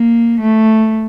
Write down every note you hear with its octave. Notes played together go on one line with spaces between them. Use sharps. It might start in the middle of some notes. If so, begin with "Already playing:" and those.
Already playing: A#3
A3